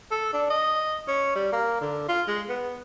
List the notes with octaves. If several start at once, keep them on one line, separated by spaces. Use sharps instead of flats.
A4
D4
D#5
C#4
G3
A#3
D3
F4
G#3
B3